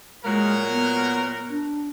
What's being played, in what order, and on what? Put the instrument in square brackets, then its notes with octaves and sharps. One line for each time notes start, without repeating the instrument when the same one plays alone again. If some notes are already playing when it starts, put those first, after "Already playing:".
[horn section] A#2 F#3 A#4 [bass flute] G#3
[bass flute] B3
D4